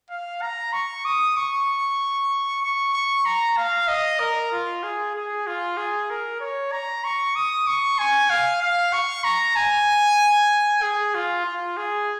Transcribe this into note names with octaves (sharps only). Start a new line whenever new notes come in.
F5
A#5
C#6
D#6
C#6
C#6
C#6
A#5
F5
D#5
A#4
F4
G#4
G#4
F4
G#4
A#4
C#5
A#5
C#6
D#6
C#6
G#5
F5
F5
C#6
A#5
G#5
G#4
F4
F4
G#4